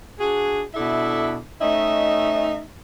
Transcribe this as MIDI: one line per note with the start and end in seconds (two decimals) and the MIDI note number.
0.19 0.62 62
0.19 0.62 66
0.19 0.62 68
0.75 1.37 47
0.75 1.37 62
0.75 1.37 64
0.75 1.37 69
0.75 1.37 76
1.60 2.61 57
1.60 2.61 61
1.60 2.61 63
1.60 2.61 75
1.60 2.61 76